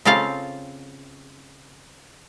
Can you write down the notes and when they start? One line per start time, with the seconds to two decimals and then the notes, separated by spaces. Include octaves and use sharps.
0.05 C#3 C4 F4 A4 F5 A#5